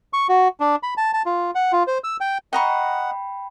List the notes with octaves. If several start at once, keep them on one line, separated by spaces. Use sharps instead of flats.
C#6
F#4
D4
B5
A5
A5
F4
F#5
F4
C5
E6
G5
D#5 F#5 G5 A#5 B5 C#6